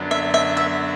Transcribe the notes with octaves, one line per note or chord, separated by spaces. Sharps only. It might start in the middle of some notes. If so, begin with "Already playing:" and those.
Already playing: F#2 D3 F#3 B3 D4
E5
E5
E5